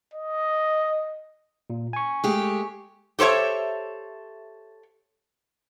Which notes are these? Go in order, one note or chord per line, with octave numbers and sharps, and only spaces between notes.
D#5
A#2
G#5 C#6
G#3 A3 G4
G4 A4 C5 C#5 E5